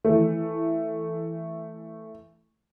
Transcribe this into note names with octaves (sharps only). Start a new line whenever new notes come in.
E3 A3